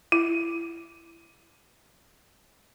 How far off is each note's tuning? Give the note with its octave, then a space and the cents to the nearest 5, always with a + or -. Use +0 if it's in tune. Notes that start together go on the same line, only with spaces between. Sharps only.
E4 +25